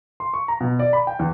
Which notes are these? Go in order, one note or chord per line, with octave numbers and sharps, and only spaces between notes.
C6
C#6
A#5
B2
D5
B5
G5
E2